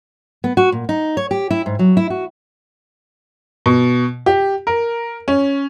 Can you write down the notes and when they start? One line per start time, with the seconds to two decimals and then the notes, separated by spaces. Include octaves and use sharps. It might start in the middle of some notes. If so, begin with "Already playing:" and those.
0.44 B3
0.57 F#4
0.72 A#2
0.89 D#4
1.17 C#5
1.31 G4
1.50 E4
1.66 G#2
1.79 F#3
1.97 E4
2.10 F#4
3.66 B2
4.26 G4
4.67 A#4
5.28 C#4